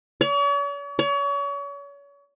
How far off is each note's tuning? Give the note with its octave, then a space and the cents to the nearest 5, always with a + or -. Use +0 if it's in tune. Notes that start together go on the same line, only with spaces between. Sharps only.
C#5 +45
C#5 +35